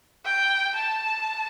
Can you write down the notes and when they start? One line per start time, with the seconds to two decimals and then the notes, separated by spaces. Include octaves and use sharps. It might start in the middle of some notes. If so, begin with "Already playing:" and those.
0.25 G5
0.75 A5